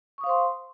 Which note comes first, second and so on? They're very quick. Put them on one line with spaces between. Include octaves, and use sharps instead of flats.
C#6 D#6 F5 C5 C6